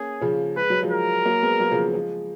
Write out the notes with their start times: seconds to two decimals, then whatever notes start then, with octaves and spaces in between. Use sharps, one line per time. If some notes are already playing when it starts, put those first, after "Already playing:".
Already playing: A#3 C#4 G#4
0.21 C#3 F3
0.56 G#3 B4
0.70 F#3
0.83 F3 G#3
0.91 A#4
1.26 F#3 A#3
1.43 G#3 B3
1.60 F#3 A#3
1.72 C#3 F3
1.94 F3 G#3